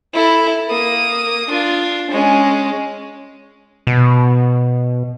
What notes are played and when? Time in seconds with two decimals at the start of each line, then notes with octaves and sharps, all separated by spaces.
0.14 E4 A4
0.68 A#3 D#6
1.49 D4 F4
2.11 G#3 C#4
3.87 B2